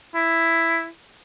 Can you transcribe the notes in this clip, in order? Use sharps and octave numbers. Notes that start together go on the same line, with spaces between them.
E4